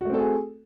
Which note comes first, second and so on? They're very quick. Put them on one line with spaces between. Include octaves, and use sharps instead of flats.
F#4 A3 C4 A4 G#4